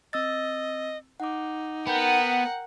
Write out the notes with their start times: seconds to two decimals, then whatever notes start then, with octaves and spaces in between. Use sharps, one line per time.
0.13 C4 D#5 E6 A6
1.20 D#4 F#5 D6
1.87 B3 A#4 F#5 G5 G6